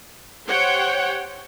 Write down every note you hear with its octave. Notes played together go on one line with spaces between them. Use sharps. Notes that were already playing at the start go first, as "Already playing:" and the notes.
G4 C5 C#5 F#5 G5